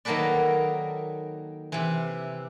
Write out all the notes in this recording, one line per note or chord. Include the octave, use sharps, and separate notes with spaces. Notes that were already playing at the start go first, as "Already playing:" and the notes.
D#3 F#3 A#3 A4 B4 D5
C3 E3